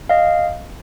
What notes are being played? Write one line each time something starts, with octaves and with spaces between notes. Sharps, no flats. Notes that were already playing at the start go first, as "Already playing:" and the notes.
D#5 F5